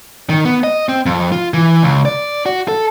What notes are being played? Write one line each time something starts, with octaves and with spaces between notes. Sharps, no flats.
D#3
B3
D#5
C4
F2
F4
E3
C#2
D5
F#4
A4